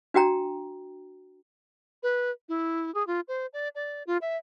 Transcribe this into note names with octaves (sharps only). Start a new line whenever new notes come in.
D4 F#4 G5 A#5
B4
E4
G#4
F4
C5
D5
D5
F4
E5